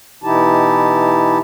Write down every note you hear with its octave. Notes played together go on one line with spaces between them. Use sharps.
B2 E3 D#4 E4 G4 A5